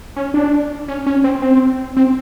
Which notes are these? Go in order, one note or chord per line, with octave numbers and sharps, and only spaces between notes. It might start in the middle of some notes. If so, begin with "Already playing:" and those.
C#4
D4
C#4
C#4
C4
C4
C4